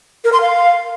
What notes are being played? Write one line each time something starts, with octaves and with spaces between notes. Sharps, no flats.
A#4
C6
F5